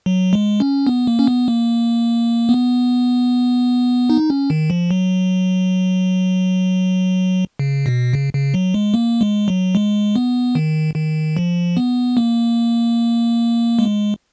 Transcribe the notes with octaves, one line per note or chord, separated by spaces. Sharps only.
F#3
G#3
C#4
B3
A#3
C#4
B3
A#3
B3
D#4
C#4
D#3
F3
F#3
C#3
B2
C#3
C#3
F#3
G#3
A#3
G#3
F#3
G#3
B3
D#3
D#3
F3
B3
A#3
G#3